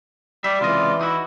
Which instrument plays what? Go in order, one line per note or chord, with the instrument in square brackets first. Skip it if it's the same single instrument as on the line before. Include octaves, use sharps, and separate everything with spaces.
[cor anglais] G3 [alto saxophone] D5 [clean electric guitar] E5
[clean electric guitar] C#2 C3 D#5 [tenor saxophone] E3 [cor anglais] F4
[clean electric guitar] D#4 F#4 [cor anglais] E4